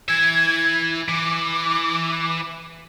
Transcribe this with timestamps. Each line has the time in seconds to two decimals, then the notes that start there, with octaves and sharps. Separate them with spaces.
0.09 E3 E5 G#6
1.09 E3 D6